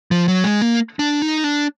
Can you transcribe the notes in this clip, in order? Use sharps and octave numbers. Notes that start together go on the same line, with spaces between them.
F3
F#3
G#3
A#3
D4
D#4
D4